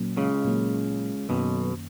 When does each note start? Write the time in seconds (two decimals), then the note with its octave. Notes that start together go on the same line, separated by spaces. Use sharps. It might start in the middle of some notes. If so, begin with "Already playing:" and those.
Already playing: A#2 F#3 A#3 C#4
0.17 C#2 C#3
0.45 A#2 F#3 A#3 C#4
1.29 B1 F#2 B2 D#3 A#3 C#4